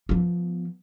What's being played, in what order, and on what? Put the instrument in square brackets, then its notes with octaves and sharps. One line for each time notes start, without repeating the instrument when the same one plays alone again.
[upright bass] F3 B3